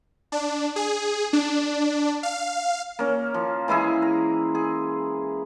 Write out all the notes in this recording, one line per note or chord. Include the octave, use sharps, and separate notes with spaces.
D4
G#4
D4
F5
A#3 C#4
F3
E3 G#3 E4 G#4
A#5
G#4